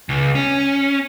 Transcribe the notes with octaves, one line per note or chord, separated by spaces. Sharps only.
C#2
C#4